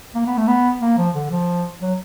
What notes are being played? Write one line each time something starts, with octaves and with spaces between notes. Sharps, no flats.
A#3
B3
A3
B3
A#3
F3
D3
F3
F#3